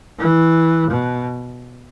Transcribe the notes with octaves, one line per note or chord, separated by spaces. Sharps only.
E3
B2